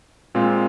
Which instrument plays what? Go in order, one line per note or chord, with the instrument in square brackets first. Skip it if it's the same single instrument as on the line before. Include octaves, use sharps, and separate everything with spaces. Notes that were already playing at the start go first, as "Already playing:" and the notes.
[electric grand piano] A#2 G#3 C4 F4